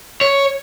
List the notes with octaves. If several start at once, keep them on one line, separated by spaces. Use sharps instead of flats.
C#5